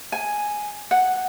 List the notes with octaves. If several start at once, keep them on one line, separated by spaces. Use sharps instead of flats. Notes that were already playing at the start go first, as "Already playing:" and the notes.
G#5
F#5